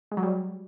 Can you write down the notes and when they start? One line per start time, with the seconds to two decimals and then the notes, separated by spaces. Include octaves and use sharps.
0.11 G#3
0.17 F#3
0.23 G3